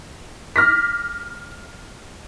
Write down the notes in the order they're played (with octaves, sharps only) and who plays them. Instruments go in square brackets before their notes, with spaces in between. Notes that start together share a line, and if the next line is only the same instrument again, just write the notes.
[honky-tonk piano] D6 F6 A#6 B6